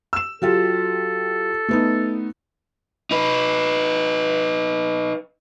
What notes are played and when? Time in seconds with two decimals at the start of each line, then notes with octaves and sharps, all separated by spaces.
0.13 E6 E7
0.42 F#3 F4 G4 A4
1.69 A3 B3 D#4
3.11 D#4 B4